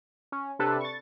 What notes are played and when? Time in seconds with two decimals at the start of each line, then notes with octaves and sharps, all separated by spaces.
0.32 C#4
0.59 C3 D4 A4 B4
0.81 C#6 A6